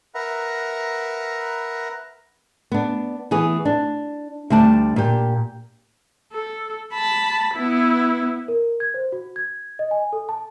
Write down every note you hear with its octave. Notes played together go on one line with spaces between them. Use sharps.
A#4 B4 E5 F#5 A#5
B3 D4
E3 B3 G#4
D4
D2 G3 D4 A5
A#2 G4
A4
A5 B5
B3 E4
A#4
G#6
C5
F#4
G#6
D#5
G#5
A4
A5